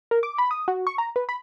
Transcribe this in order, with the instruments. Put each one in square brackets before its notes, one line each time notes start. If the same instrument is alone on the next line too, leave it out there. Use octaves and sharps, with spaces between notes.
[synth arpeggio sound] A#4
D6
B5
D#6
F#4
C#6
A#5
B4
B5